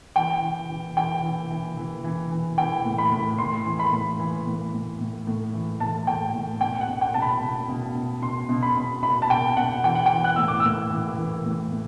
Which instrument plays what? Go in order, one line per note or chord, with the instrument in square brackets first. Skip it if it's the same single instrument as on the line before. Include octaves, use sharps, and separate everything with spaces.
[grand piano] E3 G5
E3
E3
E3 G5
E3
E3
E3
E3
E3
E3 G5
A2
B5
A2
A2 C6
E3
B5
A2
E3
A2
A2
A2
A2
E3
A2 A5
A2 G5
A2
B2 G5
F#5
B2
G5
B2 A5
B5
B2
B2
B2
B2 C6
B2
B5
B2
B2 B5
A5
B2 G5
B2 F#5
E3 G5
F#5
G5
E3
F#6
A2 E6
D6
A2 E6
E3
E3
A2
A2